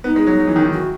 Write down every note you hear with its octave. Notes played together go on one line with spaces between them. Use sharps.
B3 D#4
G#3
F#3
F#3
E3
D#3
E3
F#4